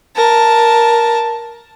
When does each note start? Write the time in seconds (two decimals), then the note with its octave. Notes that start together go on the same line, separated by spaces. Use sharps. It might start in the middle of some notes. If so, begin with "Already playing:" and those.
0.16 A#4 A5